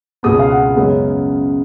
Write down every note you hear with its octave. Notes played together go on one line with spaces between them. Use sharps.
C#2 B2 G#3 B3 D#6
F5
F#5
F#2 C#3 G#3 B3